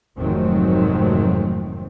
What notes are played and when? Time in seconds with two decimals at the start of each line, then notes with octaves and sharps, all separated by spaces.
0.18 F1 G#2 D#3 F#3 A3 C4